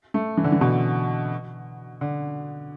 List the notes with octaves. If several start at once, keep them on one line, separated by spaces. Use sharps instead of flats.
A3
E3
D3
E3
B2
D3